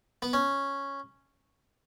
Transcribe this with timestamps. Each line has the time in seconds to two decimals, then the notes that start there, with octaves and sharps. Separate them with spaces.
0.22 B3
0.33 C#4